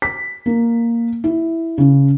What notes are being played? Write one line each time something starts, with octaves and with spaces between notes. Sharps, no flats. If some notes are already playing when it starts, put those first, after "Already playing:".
B6
A#3
E4
C#3